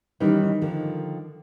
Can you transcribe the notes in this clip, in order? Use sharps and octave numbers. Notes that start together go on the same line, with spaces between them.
D#3 E3 G3 C#4 D#4 E4
D3 D#3 F3